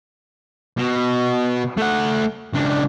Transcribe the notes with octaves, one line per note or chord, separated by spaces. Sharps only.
B2
A3 F#5
C#2 D4